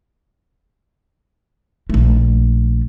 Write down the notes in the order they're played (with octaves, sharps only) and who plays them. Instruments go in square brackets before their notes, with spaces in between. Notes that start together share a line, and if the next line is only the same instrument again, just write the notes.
[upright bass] A#1 A3